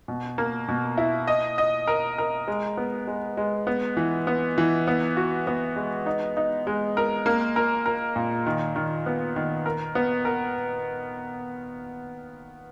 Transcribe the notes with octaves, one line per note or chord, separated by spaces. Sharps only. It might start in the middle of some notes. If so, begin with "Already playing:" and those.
B2
A#3
B2
E4
D#5
D#5
A#4
A#4
G#3
B3
G#3
G#3
B3
E3
B3
E3
B3
F#4
B3
G#3
D#4
D#4
G#3
A#4
A#3
A#4
A#4
A#2
D#3
D#3
B3
D#3
A#4
B3
A#4